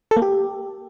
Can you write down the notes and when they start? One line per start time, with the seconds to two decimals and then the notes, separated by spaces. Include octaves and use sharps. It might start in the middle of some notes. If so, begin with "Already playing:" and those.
0.11 A4
0.17 A#3
0.22 G4